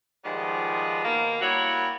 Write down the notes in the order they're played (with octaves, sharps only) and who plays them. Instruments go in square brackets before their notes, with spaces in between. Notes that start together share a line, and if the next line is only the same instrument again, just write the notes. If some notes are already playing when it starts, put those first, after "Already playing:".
[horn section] D#3 F3 G3 G#3 B3
B2 D#3 A#3
G3 A#3 E4 F#4 C#5